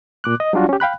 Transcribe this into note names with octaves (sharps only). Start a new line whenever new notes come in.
A#2 D6 F#6
D#5
F#3 G3 D4 F4 F#4
C#4 G4
F5 G5 B5 F#6